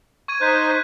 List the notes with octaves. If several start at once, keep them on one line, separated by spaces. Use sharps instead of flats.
C#6 G#6 D#7
D#4 C5 F#6 G6 B6
C#6 B6